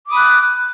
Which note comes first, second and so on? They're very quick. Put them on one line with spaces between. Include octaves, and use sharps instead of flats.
D6 D#6 B5 F#6